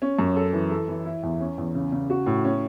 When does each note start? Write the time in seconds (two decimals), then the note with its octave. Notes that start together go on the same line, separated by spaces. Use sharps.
0.02 C#4
0.19 F#2
0.36 A4
0.53 E3
0.71 A4
0.88 E3
1.05 E4
1.23 E2
1.40 C#4
1.58 E2
1.75 C#3
1.92 C#3
2.10 F#4
2.26 A2
2.45 C#4